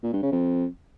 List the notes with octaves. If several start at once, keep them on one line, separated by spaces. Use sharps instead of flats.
A#2
G2
C#3
F2